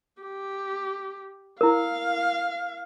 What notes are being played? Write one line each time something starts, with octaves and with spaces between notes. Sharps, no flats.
G4
E4 A#4 F5